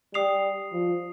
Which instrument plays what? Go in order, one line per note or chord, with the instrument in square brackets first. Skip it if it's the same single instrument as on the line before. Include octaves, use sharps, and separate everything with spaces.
[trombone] G3 [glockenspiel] D#6 C7 F7
[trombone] F3